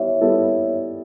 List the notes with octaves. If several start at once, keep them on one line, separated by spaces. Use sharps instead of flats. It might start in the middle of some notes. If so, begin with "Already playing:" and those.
Already playing: G3 B3 E4 C#5 E5
G3 B3 E4 A4